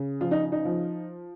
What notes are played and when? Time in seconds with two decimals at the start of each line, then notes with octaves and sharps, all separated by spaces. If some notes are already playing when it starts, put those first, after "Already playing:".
Already playing: C#3
0.21 F3 F4
0.31 D#4
0.52 D#4
0.65 F3